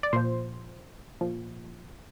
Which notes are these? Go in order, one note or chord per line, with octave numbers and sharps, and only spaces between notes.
D5
A#2 F3 C5
A#2 F3